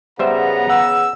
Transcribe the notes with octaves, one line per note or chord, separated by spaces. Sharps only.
C#3 G3 B3 C5 E5 A#5
F#5 E6